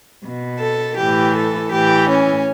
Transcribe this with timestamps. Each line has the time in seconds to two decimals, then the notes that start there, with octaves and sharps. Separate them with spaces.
0.23 B2
0.60 A4
0.97 A2 E3 G4
1.35 A4
1.71 A2 E3 G4
2.09 C#4